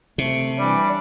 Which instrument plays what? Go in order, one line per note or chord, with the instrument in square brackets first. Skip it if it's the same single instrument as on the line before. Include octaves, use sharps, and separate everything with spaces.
[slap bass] C3 [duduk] A3
[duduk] E3 [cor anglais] G3 [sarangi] D4